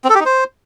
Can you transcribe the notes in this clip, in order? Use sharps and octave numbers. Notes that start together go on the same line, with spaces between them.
C4
A4
G4
D#4
C5